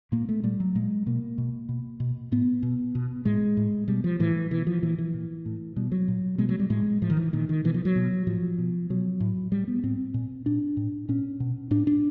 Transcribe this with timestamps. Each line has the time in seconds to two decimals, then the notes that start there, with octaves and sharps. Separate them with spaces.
0.12 A#2 A#3
0.29 A3
0.43 A#2 G3
0.60 F#3
0.75 A#2 G#3
1.06 B2 A#3
1.38 B2
1.69 B2
2.00 B2
2.32 A2 B3
2.63 B2
2.95 B2
3.25 A2 G#3
3.57 A2
3.88 B2 G3
4.04 F3
4.20 A2 E3
4.51 B2 E3
4.67 F3
4.82 A#2 E3
4.99 E3
5.14 A#2
5.46 A2
5.76 B2 G3
5.92 F#3
6.08 A#2
6.38 B2 G#3
6.49 F#3
6.60 G3
6.70 A2 G#3
7.02 A2 F3
7.10 D#3
7.17 E3
7.33 A#2 D#3
7.49 D#3
7.64 B2 E3
7.74 F3
7.85 F#3
7.96 B2
8.27 A2 F3
8.58 B2
8.90 B2 F#3
9.20 A2
9.51 A2 G3
9.68 B3
9.83 A2 C4
10.14 A#2
10.46 A#2 D4
10.77 A2
11.09 A#2 C#4
11.40 B2
11.71 A2 D4
11.87 D4